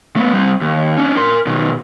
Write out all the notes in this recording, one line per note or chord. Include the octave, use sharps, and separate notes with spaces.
A3 B3
G3 C4
D#2
C#4 D4
A#4 C6
B2 D#3